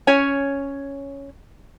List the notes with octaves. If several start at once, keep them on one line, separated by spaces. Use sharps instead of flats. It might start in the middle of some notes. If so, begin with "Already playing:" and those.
C#4 C#5 G#5